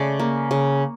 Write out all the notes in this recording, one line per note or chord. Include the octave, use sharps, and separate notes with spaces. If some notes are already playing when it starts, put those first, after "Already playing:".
Already playing: C#3 A3 D5
A#3
C#3